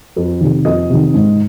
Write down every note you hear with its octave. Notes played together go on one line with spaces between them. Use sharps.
F2
C3 D#3
F2 D#5
C3 D#3
G#2